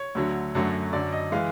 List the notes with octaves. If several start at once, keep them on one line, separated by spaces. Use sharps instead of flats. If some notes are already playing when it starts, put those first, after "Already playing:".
Already playing: C#5
D2 D3 F#3
F#2 D3 F#3 A3
F#2 D3 F#3 D5
D#5
E3 G#3 F5